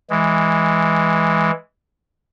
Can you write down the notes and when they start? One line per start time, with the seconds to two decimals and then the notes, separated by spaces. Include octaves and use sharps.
0.10 E3 G#3